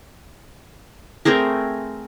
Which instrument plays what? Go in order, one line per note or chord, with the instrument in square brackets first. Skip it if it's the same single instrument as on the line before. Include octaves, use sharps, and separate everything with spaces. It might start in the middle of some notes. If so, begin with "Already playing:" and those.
[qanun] A3 C4 G#4 A#4